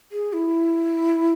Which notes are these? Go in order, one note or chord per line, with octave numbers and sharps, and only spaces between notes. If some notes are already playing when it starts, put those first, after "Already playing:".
G#4
E4